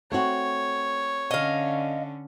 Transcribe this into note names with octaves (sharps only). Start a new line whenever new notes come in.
A3 C4 F#4 C#5
D3 C#4 D#5 F5